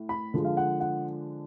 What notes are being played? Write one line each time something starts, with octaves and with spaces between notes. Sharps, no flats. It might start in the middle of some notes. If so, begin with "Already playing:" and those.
Already playing: A2
B5
D3 F3 G#3
F5
F#5
F#5